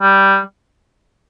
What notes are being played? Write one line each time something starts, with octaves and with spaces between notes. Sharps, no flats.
G3